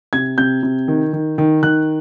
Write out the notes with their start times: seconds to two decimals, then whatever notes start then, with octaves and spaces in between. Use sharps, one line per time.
0.13 C3 G#6
0.38 C3 G6
0.63 C3
0.88 D#3
1.13 D#3
1.38 D#3
1.63 D#3 F#6